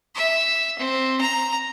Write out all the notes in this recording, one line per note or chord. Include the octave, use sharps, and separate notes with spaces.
E5
C4
A#5